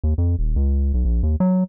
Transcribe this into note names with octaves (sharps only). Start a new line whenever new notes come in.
D#2
F2
D#1
C#2
B1
A#1
D#2
F#3